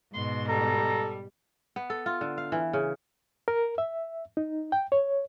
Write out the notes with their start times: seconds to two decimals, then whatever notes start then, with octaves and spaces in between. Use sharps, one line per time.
0.14 G#2 B2 C6
0.49 G3 A4 A#5
1.76 B3
1.90 A4
2.06 F4
2.21 D3
2.38 F5
2.52 E3
2.73 C#3
3.48 A#4
3.78 E5
4.37 D#4
4.72 G5
4.92 C#5